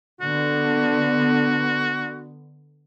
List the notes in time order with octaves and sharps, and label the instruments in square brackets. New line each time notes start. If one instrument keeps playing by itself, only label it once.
[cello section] D3 B3 [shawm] F#4